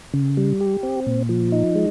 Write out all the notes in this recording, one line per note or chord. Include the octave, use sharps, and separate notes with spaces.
C#3
G3
G4
C4
A#2
F3
D#4
G#3